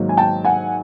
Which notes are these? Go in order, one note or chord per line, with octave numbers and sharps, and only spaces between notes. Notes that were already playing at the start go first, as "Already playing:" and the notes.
Already playing: G#2 D#3 F#3 A#3 D#4
G#5
G5 A5
F#5 G#5